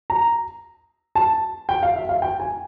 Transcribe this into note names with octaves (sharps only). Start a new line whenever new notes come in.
A#5
A5
G5
F5
E5
F5
G5
G#5